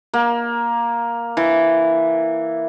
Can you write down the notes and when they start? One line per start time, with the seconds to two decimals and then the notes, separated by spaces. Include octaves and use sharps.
0.13 A#3
1.37 E3